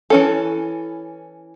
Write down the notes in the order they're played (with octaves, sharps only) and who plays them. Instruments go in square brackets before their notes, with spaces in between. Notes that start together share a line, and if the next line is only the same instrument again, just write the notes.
[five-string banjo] E3 C#4 A4